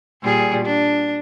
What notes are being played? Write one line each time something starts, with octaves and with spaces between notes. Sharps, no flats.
A#2 G3 G#4
D4